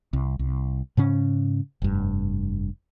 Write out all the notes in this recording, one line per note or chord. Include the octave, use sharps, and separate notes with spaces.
C2
C2
G#2 C#3 C#4
F1 G2